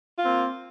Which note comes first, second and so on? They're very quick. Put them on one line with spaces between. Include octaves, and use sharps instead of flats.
F4 C4 A#3